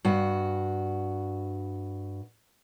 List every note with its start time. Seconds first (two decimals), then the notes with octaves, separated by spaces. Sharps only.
0.05 G2 F#4